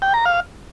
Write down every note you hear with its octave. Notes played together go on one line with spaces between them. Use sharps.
G5
A#5
F5